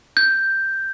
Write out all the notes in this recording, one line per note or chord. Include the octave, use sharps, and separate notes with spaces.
G6